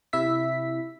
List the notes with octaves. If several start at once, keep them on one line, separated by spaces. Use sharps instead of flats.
C3 E4 E5 B6